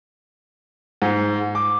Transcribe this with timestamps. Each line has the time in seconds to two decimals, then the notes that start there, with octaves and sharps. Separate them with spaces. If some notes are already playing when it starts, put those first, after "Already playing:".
1.02 G#2
1.55 D6